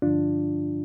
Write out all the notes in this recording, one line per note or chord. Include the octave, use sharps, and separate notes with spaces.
G2 D3 F3 D4 F4